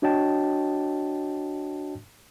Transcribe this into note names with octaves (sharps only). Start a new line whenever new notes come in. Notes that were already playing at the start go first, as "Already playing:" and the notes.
D4 F#4 C#5 D#5 G5 A5